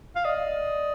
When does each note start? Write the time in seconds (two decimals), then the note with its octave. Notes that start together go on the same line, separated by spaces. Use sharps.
0.16 F5
0.25 D5 D#5